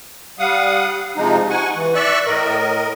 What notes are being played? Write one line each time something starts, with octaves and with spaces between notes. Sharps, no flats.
G3 F5 F#5 D#6
C3 F3 G#3 D#4
F#5 G#5 C#6
E3
D5 E5 C#6 E6 F#6
A2 A#4 D#5